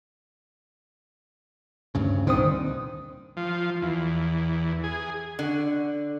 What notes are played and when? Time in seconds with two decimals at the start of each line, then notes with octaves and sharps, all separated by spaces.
1.95 D2 G2 C#3
2.27 C2 A#2 D3 D#3 C4 D#6
3.37 F3
3.82 E2
4.84 G#4
5.39 D3